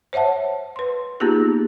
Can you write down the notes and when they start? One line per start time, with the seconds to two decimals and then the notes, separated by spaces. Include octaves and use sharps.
0.13 C5 C#5 E5 F#5 A5
0.76 B4 C6
1.20 A#3 B3 D#4 F4 G4 G#4